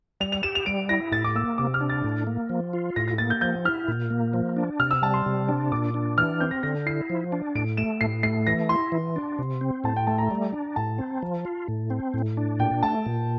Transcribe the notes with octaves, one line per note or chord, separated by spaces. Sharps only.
G3 F7
F7
G4 E7
F7
G3 D7
E4 A#6
A2 A6
D6
A#3 E6
C3 D6
F6
D4
A6
A2
A#3
F3
F4
A2 A#6
A#6
A#3 A6
G6
F3 G6
E4 F6
A#2
A#3
F3
D4
C3 F6
E6
G3 A5
C6
C3
D4
A#2 D6
D4
E3 F6
C4 G6
A#6
D3 A#6
E4 C7
F3
D4
A2 D7
A3 E7
A2 C7
A3 C7
E3 A#6
E4 C6
E3
D4
C3
C4
A2 A5
G5
A3 A5
A#5
G3
D4
A2 A5
C4
F3
F4
A2
C4
A2
D4
A#2 G5
A3 A5
A#2